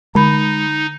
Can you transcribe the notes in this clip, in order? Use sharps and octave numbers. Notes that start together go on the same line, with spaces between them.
D3 G#3 D#4 B5